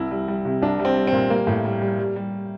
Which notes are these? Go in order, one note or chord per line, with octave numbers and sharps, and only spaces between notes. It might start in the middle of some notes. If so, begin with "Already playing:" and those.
Already playing: C2 E4
G3
G3
C3
C2 D4
G3
C4
G3
C4
A#2
G3 A#3
A2
G3
G3
G3
G3